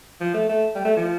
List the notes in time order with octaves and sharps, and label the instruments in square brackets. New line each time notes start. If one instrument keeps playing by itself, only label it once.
[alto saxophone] F3
A3
A3
G3
A3
F3